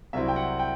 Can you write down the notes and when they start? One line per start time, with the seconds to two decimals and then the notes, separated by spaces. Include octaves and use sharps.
0.13 C2 C3 F#3 C4 E4 E5
0.29 G5
0.36 F#5
0.59 G5